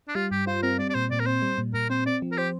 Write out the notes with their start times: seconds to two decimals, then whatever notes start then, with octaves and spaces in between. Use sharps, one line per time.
0.08 D4
0.15 G3 F4
0.31 G2 G4
0.46 F4 C5
0.63 C4 A#4
0.79 G3 D5
0.89 D5
0.94 A#2 C5
1.11 A#2 D5
1.19 A#4
1.26 C4 C5
1.42 G3
1.58 A#2
1.74 A#2 A#4
1.90 C4 C5
2.06 C4 D5
2.22 F3
2.32 A#4
2.37 G4 C5